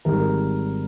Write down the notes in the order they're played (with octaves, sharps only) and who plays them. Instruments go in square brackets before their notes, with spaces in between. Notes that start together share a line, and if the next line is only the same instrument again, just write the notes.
[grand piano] G#1 G#2 G3 A#4